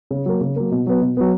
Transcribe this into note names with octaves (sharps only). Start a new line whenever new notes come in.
C#3
F#3 A#3
C#3
F#3 A#3
B2
F#3 B3
B2
F#3 B3